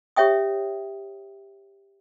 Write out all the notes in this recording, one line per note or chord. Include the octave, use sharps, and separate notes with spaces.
G4 C#5 E5 G5 D#6